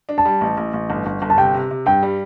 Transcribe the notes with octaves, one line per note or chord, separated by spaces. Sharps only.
D4
A5
G3
A1
A1
A1
G1
G1
G1
A5
C3 G5
C3
C3
G2 G5
G3